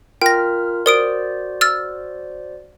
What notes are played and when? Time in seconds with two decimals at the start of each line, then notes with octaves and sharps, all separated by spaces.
0.22 F4 A#4 G5 F6 A#6
0.86 F#4 A#4 C5 D5 D#6 D7
1.61 E6 F6 A6